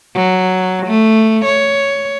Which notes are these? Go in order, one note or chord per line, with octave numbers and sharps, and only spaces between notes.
F#3
A3
C#5